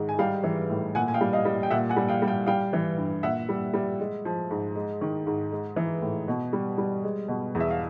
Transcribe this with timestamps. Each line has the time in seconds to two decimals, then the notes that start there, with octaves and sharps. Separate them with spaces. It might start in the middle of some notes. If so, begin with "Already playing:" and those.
Already playing: G#2 D#3
0.09 G#5
0.19 G3 F5 G5
0.44 E3
0.70 A2
0.95 A#2 F#5 G#5
1.08 G#5
1.14 F5 G5
1.21 G3
1.33 D#5 F5
1.45 G3
1.63 G5
1.70 A#2 E5 F#5
1.89 F#5 G#5
1.96 G3
2.08 F5 G5
2.22 G3
2.28 F5 G5
2.47 G3 F5 G5
2.73 E3
2.98 G2
3.23 A#2 E5 F#5
3.49 G3
3.74 G3
4.00 G#3
4.25 F3
4.51 G#2
4.76 G#3
5.01 D#3
5.27 G#2
5.52 G#3
5.76 E3
6.02 A2
6.28 B2
6.53 G3
6.78 G3
7.04 G#3
7.28 B2
7.55 E2
7.60 E5
7.70 F5